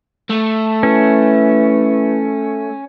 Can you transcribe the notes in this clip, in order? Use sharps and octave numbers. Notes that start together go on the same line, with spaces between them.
A3
E3 C#4